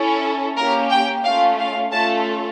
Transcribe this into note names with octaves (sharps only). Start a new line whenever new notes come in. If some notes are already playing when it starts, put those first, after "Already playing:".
Already playing: C#4 E4 A4
A#3 C#4 G4 A#4
G5
A3 C#4 F4 F5
F5
A3 C#4 F4 A4 A5